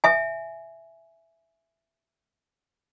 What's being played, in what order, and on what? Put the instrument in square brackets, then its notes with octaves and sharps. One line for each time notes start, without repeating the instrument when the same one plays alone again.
[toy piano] E5 G#5